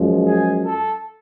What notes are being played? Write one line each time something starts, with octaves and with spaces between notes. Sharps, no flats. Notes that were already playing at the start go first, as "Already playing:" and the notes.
Already playing: F#2 F3 G#3
G#4
A4